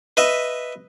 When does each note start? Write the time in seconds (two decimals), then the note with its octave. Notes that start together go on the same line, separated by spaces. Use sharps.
0.17 B4 D#5 E5